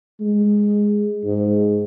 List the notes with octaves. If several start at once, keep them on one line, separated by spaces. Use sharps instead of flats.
G#3
G#2